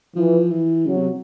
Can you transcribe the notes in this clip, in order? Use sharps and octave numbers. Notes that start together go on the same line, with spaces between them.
E3 F3
E3
C#3 F#3
C3